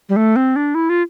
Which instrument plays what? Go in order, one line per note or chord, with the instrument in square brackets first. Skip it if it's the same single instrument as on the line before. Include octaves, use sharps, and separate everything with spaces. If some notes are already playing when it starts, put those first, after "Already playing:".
[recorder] G3
A3
C4
D4
E4
F4